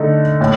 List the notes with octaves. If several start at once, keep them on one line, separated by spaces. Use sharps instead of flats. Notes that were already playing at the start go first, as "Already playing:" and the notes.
Already playing: D3 A3 D#4
A2